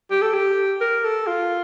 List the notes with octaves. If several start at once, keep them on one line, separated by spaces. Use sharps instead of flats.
G4
A4
G4
A#4
A4
F4